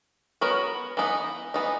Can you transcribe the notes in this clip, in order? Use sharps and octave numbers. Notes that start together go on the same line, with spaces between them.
B3 F#4 A#4 C#5
E3 B3 D#4
E3 B3 D#4